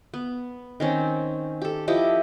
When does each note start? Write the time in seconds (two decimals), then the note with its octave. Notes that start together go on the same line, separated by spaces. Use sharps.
0.14 B3
0.80 D#3 C4 C#4
1.62 G4 A4
1.88 F3 E4 G4 D#5